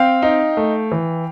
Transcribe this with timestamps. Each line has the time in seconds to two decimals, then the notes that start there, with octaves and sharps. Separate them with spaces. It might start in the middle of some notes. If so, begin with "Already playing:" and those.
Already playing: C4 F5 G5
0.22 D#4
0.57 A3
0.92 E3